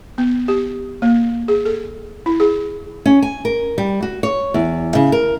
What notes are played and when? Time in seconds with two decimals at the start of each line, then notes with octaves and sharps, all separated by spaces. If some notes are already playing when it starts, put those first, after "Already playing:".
0.18 B3
0.48 G4
1.02 A#3
1.48 G#4
1.65 A4
2.26 E4
2.40 G#4
3.06 C#4
3.22 G#5
3.45 A#4
3.78 G3
4.02 F#4
4.23 C#5
4.54 E2
4.95 C#3
5.12 A#4